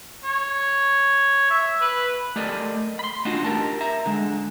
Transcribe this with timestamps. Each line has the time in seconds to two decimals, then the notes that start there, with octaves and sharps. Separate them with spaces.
0.24 C#5
1.50 E5
1.81 B4
2.36 A3 G4 A#4 D5 D#5
2.99 B5 C6
3.25 A3 D4 D#4 F4 F#4
3.45 G4 A#4 A5
3.81 E5 A#5
4.06 D3 G#3